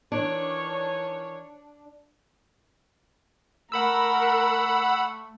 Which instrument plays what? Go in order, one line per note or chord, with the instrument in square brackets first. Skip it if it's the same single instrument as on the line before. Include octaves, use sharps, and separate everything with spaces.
[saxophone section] D#3 E3 C#5 [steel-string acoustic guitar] D4
[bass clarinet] A3 [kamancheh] A#4 [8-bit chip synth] F#5 B5 E6